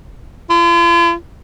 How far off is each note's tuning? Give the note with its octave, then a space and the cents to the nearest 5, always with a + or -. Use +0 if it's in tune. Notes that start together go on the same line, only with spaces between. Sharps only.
F4 -45